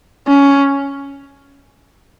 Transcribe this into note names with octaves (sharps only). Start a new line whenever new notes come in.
C#4